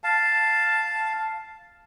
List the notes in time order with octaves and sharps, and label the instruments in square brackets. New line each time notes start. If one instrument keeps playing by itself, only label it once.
[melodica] F5 A5